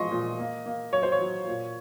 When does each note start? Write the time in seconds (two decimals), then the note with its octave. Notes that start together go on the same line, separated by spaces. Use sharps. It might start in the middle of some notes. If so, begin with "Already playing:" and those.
Already playing: F3 G#3 D#5 C6 C#6
0.11 A#2
0.39 A#3
0.66 A#3
0.93 F#3 C#5
1.03 C5
1.12 C#5
1.20 F#3
1.47 A#2